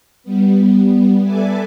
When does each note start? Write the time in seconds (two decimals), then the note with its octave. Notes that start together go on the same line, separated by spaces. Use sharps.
0.24 G3 B3
1.24 A4 B4 D5 E5 G#5 D6